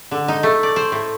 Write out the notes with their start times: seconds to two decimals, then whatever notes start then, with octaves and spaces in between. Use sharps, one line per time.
0.11 D3
0.28 D#4
0.43 A3
0.63 D5
0.76 C5
0.92 A2